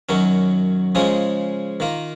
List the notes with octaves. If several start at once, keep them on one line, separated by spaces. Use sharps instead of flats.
F#2 D#3 F#3 C#4
C#3 F3 G#3 C#4 G#4
D#3 A#3 F4